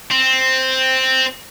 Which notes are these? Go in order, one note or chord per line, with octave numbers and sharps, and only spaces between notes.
C4